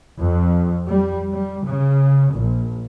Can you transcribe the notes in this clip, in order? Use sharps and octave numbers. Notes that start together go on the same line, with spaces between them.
F2
G3
G3
C#3
A#1